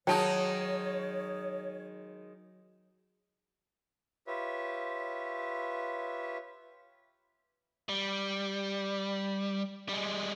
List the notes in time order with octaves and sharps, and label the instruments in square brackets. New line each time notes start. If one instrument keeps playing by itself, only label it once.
[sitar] D#3 G#3 D#4 [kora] F#3 [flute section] C#5 [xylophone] G5 A5
[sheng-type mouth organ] F4 G4 B4 C#5 E5
[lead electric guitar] G3
G3 G#3